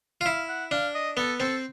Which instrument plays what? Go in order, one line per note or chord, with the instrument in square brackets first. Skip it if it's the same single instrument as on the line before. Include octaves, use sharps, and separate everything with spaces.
[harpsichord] F4
[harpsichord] E4 [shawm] F5
[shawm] F#5
[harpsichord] D4 [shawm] F5
[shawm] D#5
[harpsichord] B3 [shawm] A4
[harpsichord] C4 [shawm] A4